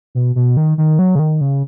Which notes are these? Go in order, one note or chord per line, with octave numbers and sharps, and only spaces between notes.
B2
B2
D#3
D#3
F#3
C#3
D#3
C#3